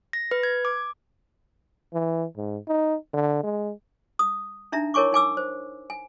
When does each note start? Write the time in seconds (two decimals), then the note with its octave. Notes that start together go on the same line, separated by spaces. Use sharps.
0.13 A#6
0.31 B4
0.43 G#6
0.65 D6
1.93 E3
2.37 G#2
2.68 D#4
3.14 D3
3.43 G#3
4.19 D#6
4.72 D4 D#4 E5 A#5
4.94 E4 A#4 C#5 G#5 C#6 D6
5.13 D#4 G#5 D6 E6
5.37 C5
5.90 G#5